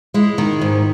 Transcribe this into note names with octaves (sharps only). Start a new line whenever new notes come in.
G#3 E4
D#3
G#2